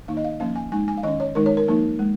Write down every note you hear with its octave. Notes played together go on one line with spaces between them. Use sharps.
D#3 A#3 D#4 F5
D#5
F5
F3 A#3 C#4 F5
G#5
G#3 D#4 G#5
G#5
F5
D#3 C#4 D#5
C#5
D#3 G#3 D#4 A#4
C#5
A#4
F3 A#3 D#4
G#3